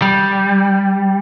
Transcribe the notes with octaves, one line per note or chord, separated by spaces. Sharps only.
G3